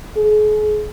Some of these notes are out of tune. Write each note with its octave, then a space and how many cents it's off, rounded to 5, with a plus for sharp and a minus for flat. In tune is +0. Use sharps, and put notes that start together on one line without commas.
G#4 +40